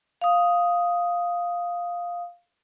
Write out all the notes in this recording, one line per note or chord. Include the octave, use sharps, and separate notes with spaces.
F5 D#6